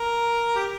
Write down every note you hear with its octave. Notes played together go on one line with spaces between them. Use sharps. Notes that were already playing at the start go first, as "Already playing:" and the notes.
Already playing: A#4
G4